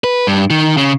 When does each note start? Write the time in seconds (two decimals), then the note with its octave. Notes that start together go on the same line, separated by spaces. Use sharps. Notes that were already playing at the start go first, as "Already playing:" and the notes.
0.04 B4
0.27 G2
0.50 D#3
0.77 C#3